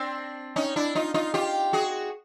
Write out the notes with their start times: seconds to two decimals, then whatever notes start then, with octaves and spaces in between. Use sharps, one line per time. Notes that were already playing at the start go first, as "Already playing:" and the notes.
Already playing: C4 D4
0.56 C#4 D#4
0.76 D4 E4
0.95 D#4 F4
1.14 D#4 F4
1.34 F4 G4
1.73 F#4 G#4